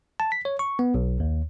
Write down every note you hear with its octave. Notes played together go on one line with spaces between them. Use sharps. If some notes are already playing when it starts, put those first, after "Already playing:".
A5
B6
C#5
C#6
B3
B1
D#2